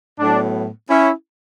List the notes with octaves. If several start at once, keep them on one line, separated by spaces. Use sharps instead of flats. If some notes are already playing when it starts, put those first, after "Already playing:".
A2 F#3 B3 D4
C#4 E4